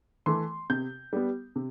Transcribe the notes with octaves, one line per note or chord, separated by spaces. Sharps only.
E3 A3 C6
C3 G6
G3 B3
C3